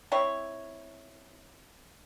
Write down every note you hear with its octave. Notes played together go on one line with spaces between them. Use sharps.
C4 E4 C#5